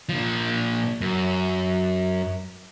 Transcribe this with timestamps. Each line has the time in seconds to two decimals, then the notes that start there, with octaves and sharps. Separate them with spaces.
0.09 A#2 F3
1.01 F#2